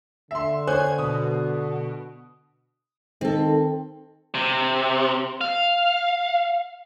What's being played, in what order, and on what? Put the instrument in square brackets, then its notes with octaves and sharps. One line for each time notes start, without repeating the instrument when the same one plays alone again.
[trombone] D3 [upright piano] E5 C6
[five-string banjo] C5 [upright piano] C#5 G#5 F#6 [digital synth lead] G#6
[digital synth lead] B2 [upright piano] D#6
[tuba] D#3 [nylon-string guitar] C4 A4
[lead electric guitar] C3
F5